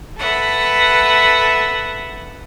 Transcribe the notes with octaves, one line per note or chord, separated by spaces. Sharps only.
A4 B4 E5 F#5